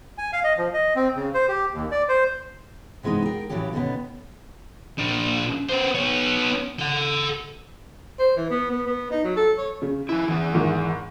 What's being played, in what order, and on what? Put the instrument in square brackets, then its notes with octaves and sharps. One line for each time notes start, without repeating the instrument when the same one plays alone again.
[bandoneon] G#5
F5
D#5
F3
D#5
C4
C#3
C5
G4
D#2
D5
C5
[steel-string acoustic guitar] C3 E3 G#3 B3 D#4
G#4 A#4 G5
A2 C#3 E3 F#3 C#4 G4
B2 D3 D#3 A#3 B3 C#4
[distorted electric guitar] A#2 D4
B3 C5
B3 C#5
A4 F#5
[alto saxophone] C5
E3
B3
B3
B3
D#4
F#3
A4
C#5
[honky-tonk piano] C#3
[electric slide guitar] F3 E4
E3 G#4
[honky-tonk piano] G#2 D#3